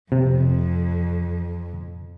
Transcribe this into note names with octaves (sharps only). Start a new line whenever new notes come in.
F2 C3